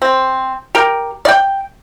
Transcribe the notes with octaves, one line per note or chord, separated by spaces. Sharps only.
C4
G4 A#4
D5 G5